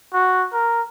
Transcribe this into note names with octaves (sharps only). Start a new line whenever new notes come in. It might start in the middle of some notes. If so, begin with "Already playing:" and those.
F#4
A#4